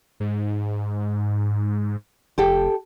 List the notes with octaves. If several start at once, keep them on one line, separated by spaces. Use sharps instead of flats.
G#2
F1 G4 A4 G5